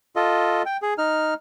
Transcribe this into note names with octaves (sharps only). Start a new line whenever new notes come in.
F4 A4 D#5
G5
G#4
D#4 F6